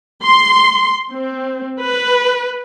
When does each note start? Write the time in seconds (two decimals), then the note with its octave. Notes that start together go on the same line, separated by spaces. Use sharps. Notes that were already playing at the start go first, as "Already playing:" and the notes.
0.23 C6
1.12 C4
1.81 B4